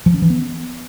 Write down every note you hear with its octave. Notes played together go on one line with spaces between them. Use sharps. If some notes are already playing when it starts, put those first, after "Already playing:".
F3
C#4
E3
B3